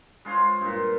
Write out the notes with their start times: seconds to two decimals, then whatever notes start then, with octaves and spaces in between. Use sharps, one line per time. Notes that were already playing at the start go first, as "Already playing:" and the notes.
0.25 G#3 F4 C5 C#5
0.61 G2 A#2